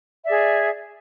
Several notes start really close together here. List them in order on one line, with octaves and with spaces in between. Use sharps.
E5 D5 G#4